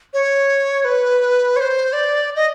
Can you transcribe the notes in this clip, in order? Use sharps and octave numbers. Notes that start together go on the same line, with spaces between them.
C#5
B4
C#5
C5
D5
D#5